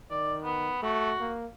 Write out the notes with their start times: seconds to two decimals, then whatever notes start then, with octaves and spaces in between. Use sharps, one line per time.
0.10 D#3 D5
0.44 B3
0.83 A3 F#4
1.20 A#3